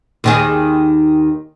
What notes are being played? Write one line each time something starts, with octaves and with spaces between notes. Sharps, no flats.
D#2 D#3 G#4